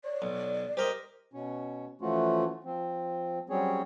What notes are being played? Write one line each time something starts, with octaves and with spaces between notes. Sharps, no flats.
C#5 D5
B1
G4 A#4 C5 D#5
B2 C#4
E3 F3 A3 C#4 F4 F#4
F3 C4
F#3 G3 C4 C#4 G#4 C#5